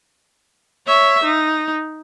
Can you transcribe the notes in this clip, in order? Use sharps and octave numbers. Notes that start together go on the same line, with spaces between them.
C#5 E5
D#4